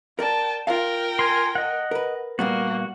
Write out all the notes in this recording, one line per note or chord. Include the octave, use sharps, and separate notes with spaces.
A#4 D5 G5 A5
F4 A#4 F5 G5
G#5 C6
D#5 F#5
A#4 B4
A#2 G3 A#3 B3 F#4